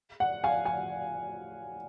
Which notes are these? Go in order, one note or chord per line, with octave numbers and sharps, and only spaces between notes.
F#5
F5 G#5
F5 G#5